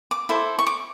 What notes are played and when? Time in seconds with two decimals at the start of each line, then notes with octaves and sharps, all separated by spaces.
0.11 D6
0.29 E4 A4 C5
0.59 C#6
0.67 D6